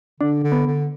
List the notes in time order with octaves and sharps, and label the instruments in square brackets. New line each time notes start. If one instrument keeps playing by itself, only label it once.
[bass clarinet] D3 [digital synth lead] D4
[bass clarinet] D3
[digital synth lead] B3
[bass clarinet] D3